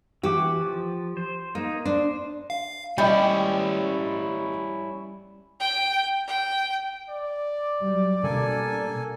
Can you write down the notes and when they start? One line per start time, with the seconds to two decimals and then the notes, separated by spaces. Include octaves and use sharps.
0.23 E3 F#4 G4 D6
0.61 F3
1.17 C5
1.55 A#3 D#4
1.85 D4 C5
2.50 F5
2.98 G3 C#4 E4 D#5 B5
5.60 G5
6.28 G5
7.09 D5
7.81 F#3 G3
8.23 B2 G3 A#3 C#4 D4 A4 G#5